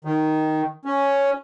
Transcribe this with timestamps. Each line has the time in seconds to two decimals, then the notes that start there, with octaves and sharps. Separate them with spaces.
0.05 D#3
0.85 C#4